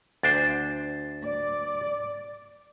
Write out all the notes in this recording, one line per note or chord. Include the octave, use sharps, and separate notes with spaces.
D2 D4 C5 A6
D5